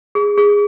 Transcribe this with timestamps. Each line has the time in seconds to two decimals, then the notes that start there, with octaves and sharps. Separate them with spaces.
0.15 G#4
0.38 G#4